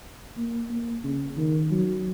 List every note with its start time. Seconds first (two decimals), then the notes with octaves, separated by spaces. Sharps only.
0.37 A#3
0.70 A#3
1.04 C#3
1.37 D#3
1.71 F#3